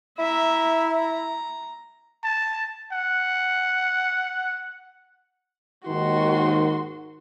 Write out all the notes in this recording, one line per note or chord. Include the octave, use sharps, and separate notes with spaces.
E4 E5 A#5
A#5
A5
F#5
D#2 G#2 D#3 F#4 C6